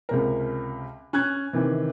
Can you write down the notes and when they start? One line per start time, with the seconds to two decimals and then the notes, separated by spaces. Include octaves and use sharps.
0.09 C#2 C3 A#4
1.13 C#4 F#6 G#6
1.53 C3 D#3 E3